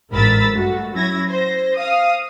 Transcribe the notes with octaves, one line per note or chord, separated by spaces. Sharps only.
A1 G#2 A#4 B5 E6 A6
G2 A3 F#4
F#3 C#4 E4 G#6 A#6
C5 A#6
F5 D#6